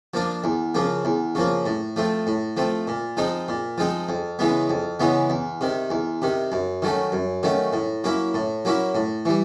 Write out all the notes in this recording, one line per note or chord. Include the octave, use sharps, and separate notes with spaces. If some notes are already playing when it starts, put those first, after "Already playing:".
F3 A#3 D4
E2
C#3 F3 A#3
E2
C#3 F3 A#3
A2
F3 A3 C4
A2
F3 A3 C4
A#2
F3 G#3 C4 D#4
A#2
F3 G#3 C4 D#4
F2
C#3 E3 G#3 B3
F2
C#3 E3 G#3 B3
E2
C3 D#3
E2
C3 D#3
F#2
D#3 F#3 A3 C#4
F#2
D#3 F#3 A3 C#4
A2
F#3 A#3 C#4 E4
A2
F#3 A#3 C#4 E4
A2
E3 G3